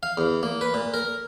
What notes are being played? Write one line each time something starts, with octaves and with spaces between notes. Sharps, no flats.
F5
E2
A#3
B4
A#2
A#4